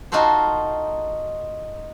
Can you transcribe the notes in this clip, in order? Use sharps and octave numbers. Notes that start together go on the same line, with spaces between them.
D#4 F4 F#4 A4 C5